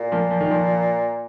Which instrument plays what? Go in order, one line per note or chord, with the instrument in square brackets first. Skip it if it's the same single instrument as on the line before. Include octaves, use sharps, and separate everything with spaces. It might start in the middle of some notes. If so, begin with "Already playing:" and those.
Already playing: [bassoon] A#2
[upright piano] F3 A#3
F3
D#3
F3